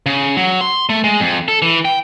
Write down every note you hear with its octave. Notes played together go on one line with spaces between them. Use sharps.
C#3
F#3
C6
A3
G#3
F2
A4
E3
G5